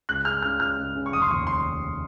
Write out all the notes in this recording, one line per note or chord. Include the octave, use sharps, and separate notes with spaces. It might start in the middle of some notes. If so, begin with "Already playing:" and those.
C#2 F#6
C#3 F6
C#3 F6
C#2 F6
C#2
C#3
C#6
F1 D#6
C6
D#2 C#6
C6